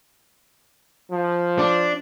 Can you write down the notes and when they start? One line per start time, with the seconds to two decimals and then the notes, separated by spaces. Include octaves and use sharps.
1.11 F3
1.59 D4